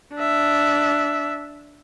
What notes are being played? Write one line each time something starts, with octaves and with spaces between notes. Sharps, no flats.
D4 E5